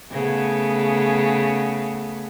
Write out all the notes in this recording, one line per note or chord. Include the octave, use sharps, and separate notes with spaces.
C#3 A3 B3